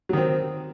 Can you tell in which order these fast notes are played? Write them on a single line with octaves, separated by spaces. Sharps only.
F#3 D#3 C4